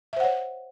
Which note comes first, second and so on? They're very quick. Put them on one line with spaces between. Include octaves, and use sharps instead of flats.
E5 C5 F#5 C#5